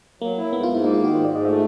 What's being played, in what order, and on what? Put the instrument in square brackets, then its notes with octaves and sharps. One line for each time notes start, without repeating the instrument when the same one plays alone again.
[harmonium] F#3 [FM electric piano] A#3
[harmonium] E4
[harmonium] G#2 [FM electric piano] B3
[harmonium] G#2 [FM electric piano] F4
[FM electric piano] E4
[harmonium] A#3 [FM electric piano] D#4
[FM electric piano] F4
[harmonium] D#3
[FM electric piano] F#4
[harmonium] G#2 [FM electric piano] C5
[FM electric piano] D5
[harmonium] G#2
[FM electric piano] D#5
[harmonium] A3 [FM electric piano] E5